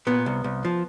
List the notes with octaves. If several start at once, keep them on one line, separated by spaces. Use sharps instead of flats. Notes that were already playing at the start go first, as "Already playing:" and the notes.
A#2 B3
C2
C2
F3